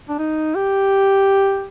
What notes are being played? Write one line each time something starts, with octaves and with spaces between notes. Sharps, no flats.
D4
D#4
G4